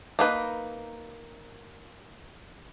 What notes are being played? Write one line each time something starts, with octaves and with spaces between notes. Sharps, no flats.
A#3 D#4 B4